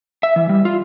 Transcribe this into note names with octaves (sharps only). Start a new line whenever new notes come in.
E5
E3
G3
F4